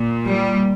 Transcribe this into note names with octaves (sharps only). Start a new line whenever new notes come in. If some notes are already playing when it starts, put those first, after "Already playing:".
Already playing: A#2
G3